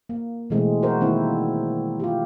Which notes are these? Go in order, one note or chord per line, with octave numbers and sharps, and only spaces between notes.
A#3
B2 E3 G#3 A3 C4
F#4 A#4 C5
D#3 G3 A#3 C4 E4
F4 G4